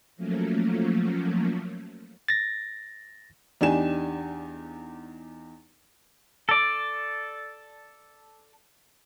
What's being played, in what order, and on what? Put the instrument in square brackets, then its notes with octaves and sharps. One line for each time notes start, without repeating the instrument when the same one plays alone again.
[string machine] F3 F#3 A3 A#3 C#4
[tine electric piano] A6 A#6
[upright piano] E2 D4 D#4 G4 G#5 E7
[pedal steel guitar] A4 D5